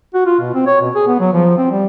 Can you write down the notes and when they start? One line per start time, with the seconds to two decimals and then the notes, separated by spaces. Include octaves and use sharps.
0.14 F#4
0.26 F4
0.40 B2
0.54 C4
0.66 C#5
0.81 B2
0.95 G#4
1.07 B3
1.20 F#3
1.33 F3
1.58 C4
1.71 G3